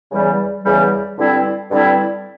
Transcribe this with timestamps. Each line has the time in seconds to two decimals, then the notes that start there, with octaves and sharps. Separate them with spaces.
0.11 E2 C#3 E3 G3
0.64 E2 C#3 E3 G3
1.18 G2 D3 G3 C4 E4
1.71 G2 D3 G3 C4 E4